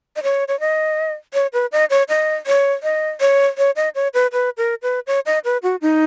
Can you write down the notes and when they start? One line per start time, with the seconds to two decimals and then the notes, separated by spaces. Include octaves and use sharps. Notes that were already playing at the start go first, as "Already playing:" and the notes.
0.16 D#5
0.23 C#5
0.48 C#5
0.60 D#5
1.34 C#5
1.53 B4
1.72 D#5
1.90 C#5
2.09 D#5
2.47 C#5
2.83 D#5
3.21 C#5
3.58 C#5
3.76 D#5
3.95 C#5
4.14 B4
4.32 B4
4.57 A#4
4.82 B4
5.07 C#5
5.26 D#5
5.45 B4
5.63 F#4
5.82 D#4